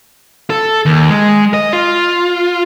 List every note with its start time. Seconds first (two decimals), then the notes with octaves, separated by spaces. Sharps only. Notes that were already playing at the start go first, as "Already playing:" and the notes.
0.50 A4
0.86 D#2
1.10 G#3
1.54 D#5
1.73 F4